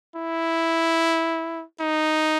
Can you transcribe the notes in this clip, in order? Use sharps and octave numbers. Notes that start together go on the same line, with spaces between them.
E4
D#4